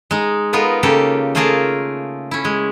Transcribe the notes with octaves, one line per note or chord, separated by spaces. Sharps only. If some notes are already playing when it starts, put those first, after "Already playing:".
G#3 D#4
B3 D#4 F4 A#4 B4
C#3 A#3 F4 G4 A4
A3 A#3 F4 G#4 A#4 A5
C#4 E4
G#3